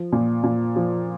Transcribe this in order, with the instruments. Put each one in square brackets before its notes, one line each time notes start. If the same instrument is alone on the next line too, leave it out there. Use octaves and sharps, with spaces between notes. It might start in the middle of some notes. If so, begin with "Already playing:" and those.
Already playing: [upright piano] F3
A#2
A#2
F3